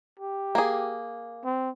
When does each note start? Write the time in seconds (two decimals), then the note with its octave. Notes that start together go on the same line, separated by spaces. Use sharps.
0.19 G4
0.55 A#3 G#4
1.45 C4